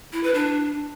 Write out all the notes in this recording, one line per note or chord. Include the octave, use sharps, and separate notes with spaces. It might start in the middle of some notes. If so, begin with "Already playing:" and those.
E4
B4
D4